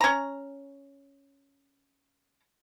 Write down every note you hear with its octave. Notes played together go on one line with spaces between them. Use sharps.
C#4 A#5